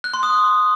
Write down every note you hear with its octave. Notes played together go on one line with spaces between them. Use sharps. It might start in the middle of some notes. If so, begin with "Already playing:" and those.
F#6
C6
D#6